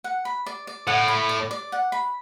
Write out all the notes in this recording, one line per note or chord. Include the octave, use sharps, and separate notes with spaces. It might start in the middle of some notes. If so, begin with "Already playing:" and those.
F#5
B5
D5
D5
A2 F#5
B5
D5
D5
F#5
B5